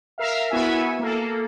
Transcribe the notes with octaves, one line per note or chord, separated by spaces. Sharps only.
A#4 E5 F5
B3 E4 F#4 E5 G#5
A#3 A4